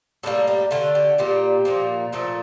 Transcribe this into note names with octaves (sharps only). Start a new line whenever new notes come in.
A2 G3 A#3 A4
G4
D3 A3 F4
G4
A#2 G3 A#3 G4
A#2 F3 A#3
A#2 F3 A3 A4